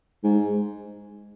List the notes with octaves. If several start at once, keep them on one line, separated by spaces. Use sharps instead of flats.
G#2